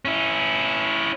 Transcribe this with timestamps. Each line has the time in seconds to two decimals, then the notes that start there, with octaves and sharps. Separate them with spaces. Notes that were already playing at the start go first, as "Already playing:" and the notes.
0.05 C#4 E4